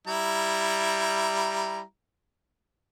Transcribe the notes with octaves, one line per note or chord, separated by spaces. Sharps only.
G3 E4 A#5